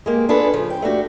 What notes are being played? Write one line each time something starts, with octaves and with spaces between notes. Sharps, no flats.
G#3 A#3 G4
B3 D4 F4 G#4 A4 B4
C#3 F3
G5
A3 D4 F#4 G4